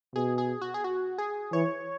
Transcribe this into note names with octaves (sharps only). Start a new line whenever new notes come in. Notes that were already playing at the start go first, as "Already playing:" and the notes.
B2 G#4
G#4
F#4
G#4
F#4
G#4
E3 C#5